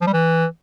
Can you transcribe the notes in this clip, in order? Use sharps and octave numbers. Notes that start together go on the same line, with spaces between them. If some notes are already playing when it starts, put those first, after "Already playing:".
F3
G3
E3